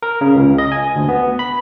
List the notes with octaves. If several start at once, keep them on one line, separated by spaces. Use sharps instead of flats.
A#4
C#3
C#2
D#5
G#5
D2
B3
B5